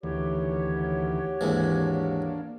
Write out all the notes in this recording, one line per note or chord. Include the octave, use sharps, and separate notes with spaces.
D2 D#3 E3 F#4 G4 C#5
D#2 G#2 E3 A#3 D4